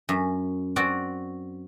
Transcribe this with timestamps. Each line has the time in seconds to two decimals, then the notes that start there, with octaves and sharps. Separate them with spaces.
0.09 F#2
0.76 C4 F#4 D5